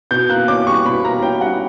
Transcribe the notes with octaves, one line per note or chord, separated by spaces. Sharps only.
B2 G6
A#3 F#6
C#4 D6
G3 C#6
B2 B5
A#3 A#5
C#4 G5
G3 F#5